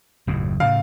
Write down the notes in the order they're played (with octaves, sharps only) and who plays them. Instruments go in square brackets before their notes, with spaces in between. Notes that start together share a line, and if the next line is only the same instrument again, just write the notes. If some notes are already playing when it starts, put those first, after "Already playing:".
[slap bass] F#1 D#2 A2
[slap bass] A2 C#3 [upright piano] F5